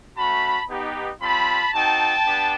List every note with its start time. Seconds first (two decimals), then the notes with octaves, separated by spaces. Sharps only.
0.17 A3 C#4 F#4 A5 B5
0.70 B3 D#4 G4
1.21 G3 C4 F4 A5 B5
1.73 C4 D#4 F#4 G5 A5
2.26 B3 D4 G4